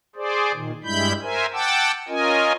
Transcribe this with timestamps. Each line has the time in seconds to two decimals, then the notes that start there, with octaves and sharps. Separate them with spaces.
0.16 G#4 C5 D5
0.53 A#2 D#3
0.84 G2 G3 G#3 E4 B5 G6
1.23 A#4 C5 E5 G#5
1.53 F#5 G5 A5 D6 E6
2.08 C#4 F4 A#4 D#5 G#5